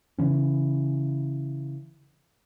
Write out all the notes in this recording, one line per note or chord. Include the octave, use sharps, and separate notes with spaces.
C#3 E3 C#4